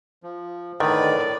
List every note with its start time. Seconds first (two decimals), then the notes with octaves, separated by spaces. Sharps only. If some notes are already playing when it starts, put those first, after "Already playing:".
0.23 F3
0.80 A2 D3 D#3 B4 D5 D#5